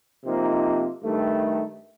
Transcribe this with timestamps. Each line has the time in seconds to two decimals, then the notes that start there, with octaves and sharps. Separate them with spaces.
0.24 C3 F3 A#3 D#4
1.01 G2 D#3 A3